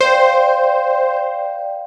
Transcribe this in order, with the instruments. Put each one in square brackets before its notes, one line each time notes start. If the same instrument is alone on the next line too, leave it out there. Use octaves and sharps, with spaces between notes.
[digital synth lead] C5 [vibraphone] D5 F5 G5